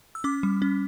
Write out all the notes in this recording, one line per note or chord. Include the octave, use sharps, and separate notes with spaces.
E6
C#4 D6
G3
C#4